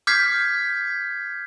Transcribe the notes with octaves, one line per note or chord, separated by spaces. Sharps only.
D6 F6 G6 G#6 B6 C7